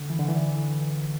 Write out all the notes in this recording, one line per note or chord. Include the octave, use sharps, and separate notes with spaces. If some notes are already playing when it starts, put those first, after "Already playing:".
Already playing: D3
E3
D3
E3